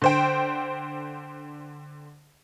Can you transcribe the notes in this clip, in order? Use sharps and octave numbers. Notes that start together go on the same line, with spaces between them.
D3 C5 G5